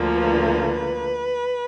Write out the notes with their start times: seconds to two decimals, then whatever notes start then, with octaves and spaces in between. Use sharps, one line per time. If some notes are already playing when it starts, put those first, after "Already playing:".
Already playing: D2 D3 F3 A#3
0.16 B4